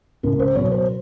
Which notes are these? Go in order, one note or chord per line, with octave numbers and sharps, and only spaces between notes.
C#2 A#4
C5
B2 F#3 C#5
C5